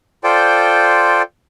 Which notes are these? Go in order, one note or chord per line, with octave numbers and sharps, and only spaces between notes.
F4 A4 C5 D5 G5